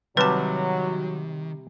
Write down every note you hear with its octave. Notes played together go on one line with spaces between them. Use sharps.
C3 D#3 F#3 G3 B4 A5